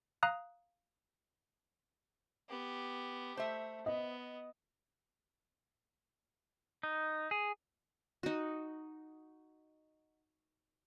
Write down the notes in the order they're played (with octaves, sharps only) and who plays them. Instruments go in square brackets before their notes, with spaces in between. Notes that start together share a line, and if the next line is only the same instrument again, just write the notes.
[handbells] F5 A#5 D#6 F#6
[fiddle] B3 G4
[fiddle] A3 [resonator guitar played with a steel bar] C5 E5
[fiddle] B3 [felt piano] D#5
[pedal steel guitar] D#4
G#4
[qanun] D#4 F#4